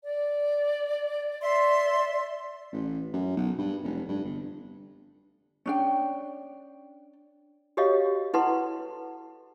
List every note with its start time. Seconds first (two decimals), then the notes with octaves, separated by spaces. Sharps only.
0.03 D5
1.42 D5 E5 C6
2.73 A1
3.13 F#2
3.36 B1
3.58 G2
3.84 F1
4.08 G2
4.25 G1
5.66 C#4 D4 G5
7.77 F#4 G4 A4 C#5 D#5 F5
8.34 E4 A4 B4 F#5 A5 C6